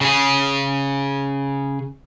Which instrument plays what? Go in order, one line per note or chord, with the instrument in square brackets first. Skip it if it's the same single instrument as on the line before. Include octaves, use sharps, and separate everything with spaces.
[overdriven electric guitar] C#3 G#4